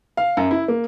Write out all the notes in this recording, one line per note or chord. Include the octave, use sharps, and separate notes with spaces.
F5
F#2
E4
A#3